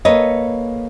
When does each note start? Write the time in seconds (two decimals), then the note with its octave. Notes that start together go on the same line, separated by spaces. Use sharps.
0.05 A#3 A4 B4 C#5 D#5